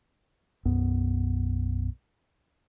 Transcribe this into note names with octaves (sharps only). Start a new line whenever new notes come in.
B1 F#2 B3